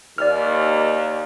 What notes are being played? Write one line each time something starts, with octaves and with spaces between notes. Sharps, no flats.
D#2 D5 F6